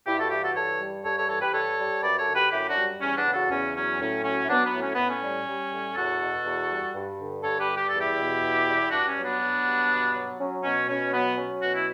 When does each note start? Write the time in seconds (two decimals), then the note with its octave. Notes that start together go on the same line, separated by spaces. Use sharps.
0.06 G2 E4 G4
0.18 F#4 A4
0.30 E3 E4 G4
0.43 F#4 A4
0.55 G2 A4 C#5
0.80 G3
1.04 G2 A4 C#5
1.17 A4 C#5
1.29 E3 A4 C#5
1.41 G4 B4
1.53 G2 A4 C#5
1.78 G3
2.03 F#2 B4 D5
2.19 A4 C#5
2.27 D3
2.35 G4 B4
2.51 F#2 E4 G4
2.68 D4 F#4
2.77 G3
3.01 E2 C#4
3.17 B3 D4
3.26 C#3
3.33 F#4 A4
3.50 E2 C#4
3.75 F#3 C#4
4.00 A2 C#4
4.24 F#3 C#4
4.43 E4
4.48 F#3 B3 D4
4.65 B3
4.74 A2
4.81 C#4
4.95 A2 B3
5.09 C#4
5.22 G3
5.47 G3
5.72 A2
5.96 E2 F#4 A4
6.21 B2
6.45 E2
6.71 G3
6.95 G2
7.20 D3
7.43 G2 A4 C#5
7.60 G4 B4
7.69 G3
7.77 G4
7.89 E2 A4
8.00 E4 G4
8.17 B2
8.42 E2
8.67 G3
8.91 G2 D4 F#4
9.08 C#4
9.16 F#3
9.24 B3 D4
9.41 F#3
9.64 G2
9.90 B2
10.14 F#3
10.39 F#3 C#4
10.64 B2 C#4
10.87 B2 C#4
11.13 F#3 B3
11.37 F#3 C#4
11.62 B2 F#4
11.75 E4